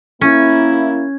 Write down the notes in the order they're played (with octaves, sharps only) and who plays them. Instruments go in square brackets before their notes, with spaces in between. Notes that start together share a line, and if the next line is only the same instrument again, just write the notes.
[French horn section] A#3 E4 [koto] C#4